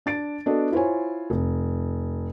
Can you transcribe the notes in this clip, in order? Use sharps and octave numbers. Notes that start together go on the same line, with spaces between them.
D4 A6 D7
B3 D4 F#4 A4 D#5
E4 F4 C5 C#5 G#5
F1